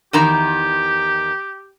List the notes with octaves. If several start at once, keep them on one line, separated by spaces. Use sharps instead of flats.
E2 D#3 G4 A#5